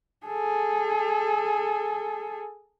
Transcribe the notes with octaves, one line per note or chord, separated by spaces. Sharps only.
G#4 A4